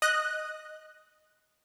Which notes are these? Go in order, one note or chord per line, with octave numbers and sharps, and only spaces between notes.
D#5 F#6